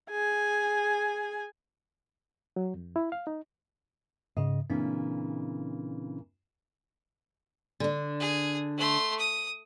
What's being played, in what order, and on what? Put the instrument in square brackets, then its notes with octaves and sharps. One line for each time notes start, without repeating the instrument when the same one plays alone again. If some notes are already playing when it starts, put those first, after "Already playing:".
[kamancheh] G#4 G#5
[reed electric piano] F#3
F2
E4
F5
D#4
[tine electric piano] G#2 C#3 [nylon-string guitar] D#5
[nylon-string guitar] A#2 C#3 E3 [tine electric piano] C4 D4
[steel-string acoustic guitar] D3 D4
[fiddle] G#4
A3 C6
D#6